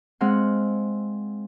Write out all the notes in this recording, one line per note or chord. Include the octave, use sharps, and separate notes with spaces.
G#3 C4 F5 F#5